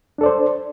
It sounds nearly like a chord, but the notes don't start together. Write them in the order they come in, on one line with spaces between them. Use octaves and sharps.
D4 A4 D5 C5